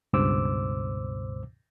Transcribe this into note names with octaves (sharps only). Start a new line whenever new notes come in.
C#2 G2 B2 C5 D6 E6